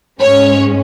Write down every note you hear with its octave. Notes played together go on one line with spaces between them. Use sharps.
G#2 G#3 C#4 C#5